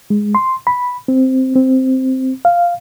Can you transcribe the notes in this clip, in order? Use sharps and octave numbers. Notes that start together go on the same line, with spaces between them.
G#3
C6
B5
C4
C4
F5